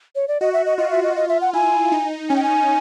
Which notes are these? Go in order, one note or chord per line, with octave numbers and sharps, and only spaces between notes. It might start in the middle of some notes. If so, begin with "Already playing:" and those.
C#5
D5
F#4 D#5
E5
D#5
F4 D#5
E5
D#5
D#5
E5
F#5
E4 G#5
D#4
C#4 G#5
G5
G#5